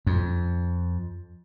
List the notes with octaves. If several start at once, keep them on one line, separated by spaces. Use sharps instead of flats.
F2